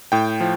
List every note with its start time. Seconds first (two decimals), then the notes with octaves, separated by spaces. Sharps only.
0.12 A2 G5
0.40 F3